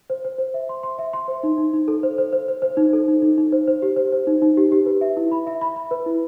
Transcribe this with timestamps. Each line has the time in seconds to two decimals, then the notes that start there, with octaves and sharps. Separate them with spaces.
0.10 C5
0.25 C5
0.38 C5
0.54 E5
0.69 C6
0.83 C6
0.99 E5
1.13 C6
1.28 C5
1.43 D#4
1.58 D#4
1.73 D#4
1.88 A4
2.03 C5
2.18 C5
2.33 C5
2.48 C5
2.62 C5
2.77 D#4
2.93 A4
3.08 D#4
3.22 D#4
3.38 D#4
3.52 C5
3.67 C5
3.82 G4
3.96 C5
4.12 C5
4.27 D#4
4.42 D#4
4.57 G4
4.72 G4
4.86 B4
5.01 E5
5.17 E4
5.32 B5
5.47 E5
5.61 B5
5.76 B5
5.91 B4
6.06 E4